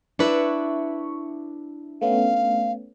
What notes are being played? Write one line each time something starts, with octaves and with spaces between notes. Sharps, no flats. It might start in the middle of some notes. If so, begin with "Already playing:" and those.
D4 E4 B4 C#6
A3 B3 C#4 F5